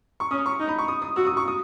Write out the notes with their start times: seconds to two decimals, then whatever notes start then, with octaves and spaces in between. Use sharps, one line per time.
0.20 C#6
0.31 C#4 D#6
0.46 C#6
0.60 D#4
0.69 B5
0.78 C#6
0.88 D#6
1.02 D#6
1.16 F#4 E6
1.26 D#6
1.37 C#6
1.48 D#6